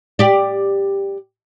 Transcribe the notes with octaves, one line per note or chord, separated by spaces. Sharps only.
G4 D5